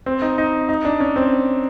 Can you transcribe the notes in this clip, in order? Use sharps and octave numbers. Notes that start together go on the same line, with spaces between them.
C4
D#4
D#4
D#4
D4
C#4
C4